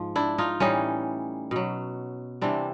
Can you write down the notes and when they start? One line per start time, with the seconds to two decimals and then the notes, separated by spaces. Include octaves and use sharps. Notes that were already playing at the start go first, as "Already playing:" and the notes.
Already playing: G#2 F3
0.16 D4 E4
0.38 D#4 F4
0.60 A2 E3 G3 C#4 D#4
1.51 B2 F#3
2.41 C3 E3 G3 C4 D4